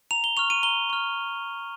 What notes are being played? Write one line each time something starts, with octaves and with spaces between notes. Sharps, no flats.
A#5 F7
G7
C#6 F6 F7
D#7
A#5 G7
C#6 F6